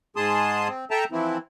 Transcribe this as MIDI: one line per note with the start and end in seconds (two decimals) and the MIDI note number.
0.16 0.68 44
0.16 0.68 56
0.16 0.68 68
0.16 0.68 81
0.16 0.68 84
0.16 0.68 87
0.68 0.85 60
0.91 1.04 69
0.91 1.04 76
0.91 1.04 79
0.91 1.04 81
0.91 1.04 82
1.12 1.38 52
1.12 1.38 53
1.12 1.38 60
1.12 1.38 64